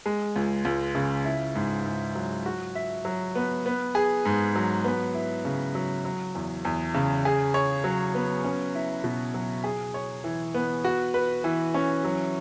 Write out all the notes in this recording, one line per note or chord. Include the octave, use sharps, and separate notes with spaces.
G#3
C#2
C#2
C#3
E4
G#2
G#2
F#3
F#4
E5
F#3
B3
B3
G#4
G#2
F#3
B3
E4
C#3
F#3
F#3
E2
E2
C#3
G#4
C#5
F#3
B3
C#4
E4
B2
F#3
G#4
C#5
E3
B3
F#4
B4
E3
C#4
F#3